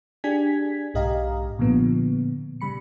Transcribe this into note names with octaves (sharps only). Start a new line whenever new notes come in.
D4 G4 G#4 G#5 G#6 B6
B1 G#2 G4 D#5 F5 A#5
A#2 D3 F3 B3
C#3 G3 B5 C#7